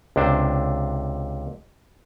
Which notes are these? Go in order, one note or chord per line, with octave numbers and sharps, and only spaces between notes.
C#2 C3 D4 C5